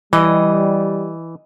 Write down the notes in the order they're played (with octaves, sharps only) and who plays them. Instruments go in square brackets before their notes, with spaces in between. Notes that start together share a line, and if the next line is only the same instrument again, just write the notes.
[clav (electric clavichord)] E3 [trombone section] G3 [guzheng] D#5